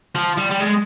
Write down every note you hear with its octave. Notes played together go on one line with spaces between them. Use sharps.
F3
G3
G3
G#3